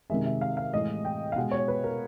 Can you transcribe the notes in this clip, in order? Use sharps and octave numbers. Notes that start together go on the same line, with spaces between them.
C3 D#3 G#3 E5
E5
F5
F5
A2 E3 G#3 D#5
G5
F5
B2 G#3 F#5
C#5
B4
A#4